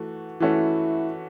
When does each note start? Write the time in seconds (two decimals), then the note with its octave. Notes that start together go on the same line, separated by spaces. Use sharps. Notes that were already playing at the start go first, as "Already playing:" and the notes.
Already playing: E3 A3 F#4
0.40 E3 A3 C#4 E4 F#4